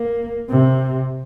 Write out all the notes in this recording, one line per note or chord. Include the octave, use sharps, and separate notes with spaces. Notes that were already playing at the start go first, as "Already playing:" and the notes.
Already playing: A#3
C3